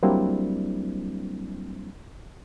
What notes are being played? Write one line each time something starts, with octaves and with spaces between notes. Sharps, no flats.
F#3 G3 A#3 C4 D4 E4